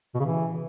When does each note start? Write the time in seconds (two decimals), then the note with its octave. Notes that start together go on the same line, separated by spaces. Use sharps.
0.14 B2
0.20 C#3
0.25 E3